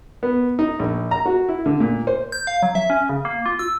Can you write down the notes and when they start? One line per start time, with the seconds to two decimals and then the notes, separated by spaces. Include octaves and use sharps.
0.23 B3
0.59 D#4
0.79 A#1
1.11 A#5
1.26 F#4
1.49 E4
1.66 D3
1.80 A#2
2.07 C5
2.32 G6
2.47 F5
2.63 F#3
2.75 E5
2.90 C#4
3.09 C#3
3.25 A#3
3.46 F4
3.59 E6